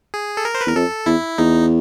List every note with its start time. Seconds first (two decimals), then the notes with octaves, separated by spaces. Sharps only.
0.14 G#4
0.37 A4
0.45 A#4
0.55 C5
0.61 B4
0.66 E2 A#4
0.75 F2 A4
1.06 E2 E4
1.38 E2 D#4